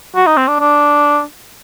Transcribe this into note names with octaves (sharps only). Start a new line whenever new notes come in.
F#4
D#4
C4
D4
D4